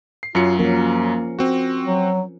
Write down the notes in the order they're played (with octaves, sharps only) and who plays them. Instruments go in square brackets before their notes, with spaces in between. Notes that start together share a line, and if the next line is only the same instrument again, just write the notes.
[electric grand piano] C7
[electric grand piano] F#2 F#3 C#7 [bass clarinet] F4
[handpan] F3 C#4 A#4 [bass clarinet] A#3
[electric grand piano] C4 F#4
[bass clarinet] F#3